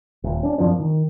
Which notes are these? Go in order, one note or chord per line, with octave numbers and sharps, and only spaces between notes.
D#1
C#4 D4
F#2 F3 C4 D4
D#3